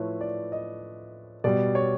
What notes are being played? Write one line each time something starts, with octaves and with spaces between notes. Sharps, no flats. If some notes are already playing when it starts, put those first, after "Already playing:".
Already playing: A2 F3 A3 B4 C#5
D5
D#5
B2 G3 D5
C#5